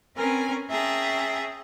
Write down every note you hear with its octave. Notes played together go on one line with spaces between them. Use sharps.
C4 C#4 A#4 B4 G#5
C#4 G#4 E5 G5 A5 A#5